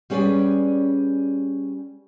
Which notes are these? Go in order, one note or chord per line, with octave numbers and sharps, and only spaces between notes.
G3 C#4 G#4 B4 D5